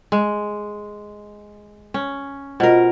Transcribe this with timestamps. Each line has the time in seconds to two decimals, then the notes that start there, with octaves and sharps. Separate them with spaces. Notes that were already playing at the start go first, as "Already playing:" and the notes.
0.12 G#3
1.94 C#4
2.60 B2 F4 A#4 C5 D#5